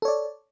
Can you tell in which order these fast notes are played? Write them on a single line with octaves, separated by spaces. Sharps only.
A4 C#5 D5